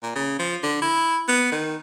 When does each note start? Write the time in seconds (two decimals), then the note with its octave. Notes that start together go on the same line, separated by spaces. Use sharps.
0.03 A#2
0.16 C#3
0.39 F3
0.63 D3
0.82 E4
1.28 B3
1.52 D#3